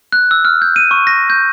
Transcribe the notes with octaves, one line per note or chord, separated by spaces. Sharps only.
F#6
E6
F6
G6
D#7
C#6
A#6
G6